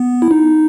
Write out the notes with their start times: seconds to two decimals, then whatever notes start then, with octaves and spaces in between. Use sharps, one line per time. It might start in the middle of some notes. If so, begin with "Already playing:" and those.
Already playing: B3
0.22 E4
0.31 D#4